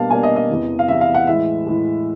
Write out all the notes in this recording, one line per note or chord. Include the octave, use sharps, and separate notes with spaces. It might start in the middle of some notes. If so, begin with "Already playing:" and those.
Already playing: B2 G3 A#3 D4 F5 A5
B2 G3 A#3 D4 G#5
D#5
D#5
E2 C3 E3
F5
E2 C3 E3 E5
F5
F#5
A2 E3 G#3 E5
A2 E3 G#3